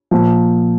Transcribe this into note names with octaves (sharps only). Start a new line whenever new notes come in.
A#2 F3